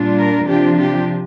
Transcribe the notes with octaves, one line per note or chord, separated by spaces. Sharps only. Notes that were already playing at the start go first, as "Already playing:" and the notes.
Already playing: A#2 G3 D4 F4
A#4
C3 F3 D4 F4 G4
G4